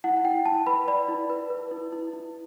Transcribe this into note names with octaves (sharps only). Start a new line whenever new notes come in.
E4 F#5
F#5
E4 G5
E4 A5
B4 B5
D5 B5
E4
B4
B4
E4
E4
E4